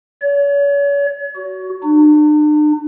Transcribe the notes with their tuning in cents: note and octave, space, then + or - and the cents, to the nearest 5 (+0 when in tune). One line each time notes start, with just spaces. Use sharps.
C#5 +40
F#4 +15
D4 +45